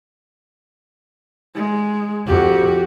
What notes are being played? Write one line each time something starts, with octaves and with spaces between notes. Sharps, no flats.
G#3
F2 F#4 G4